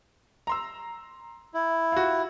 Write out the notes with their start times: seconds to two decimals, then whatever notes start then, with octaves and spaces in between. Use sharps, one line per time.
0.47 A#5 C6 E6
1.54 E4
1.92 F4 F#4